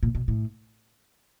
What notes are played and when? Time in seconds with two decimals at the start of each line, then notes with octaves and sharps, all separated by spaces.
0.03 A#2
0.15 B2
0.28 A2